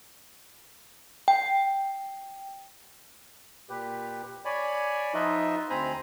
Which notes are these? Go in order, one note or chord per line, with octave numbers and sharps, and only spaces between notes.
G5
A#2 G4 B4
C#5 D5 G#5 B5
F3 D#4 F4 B4 D#5 E5
D2 C4 C5 G#5 A#5 B5